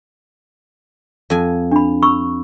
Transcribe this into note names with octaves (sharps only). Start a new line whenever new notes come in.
F2 G#5
D4 B5
B5 C#6 E6